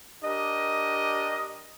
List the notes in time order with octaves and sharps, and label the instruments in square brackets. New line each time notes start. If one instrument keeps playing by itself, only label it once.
[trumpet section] D4 G4 A#4 D#5